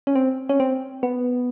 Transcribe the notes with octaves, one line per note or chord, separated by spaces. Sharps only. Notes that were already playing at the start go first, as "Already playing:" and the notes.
C#4
C4
C#4
C4
B3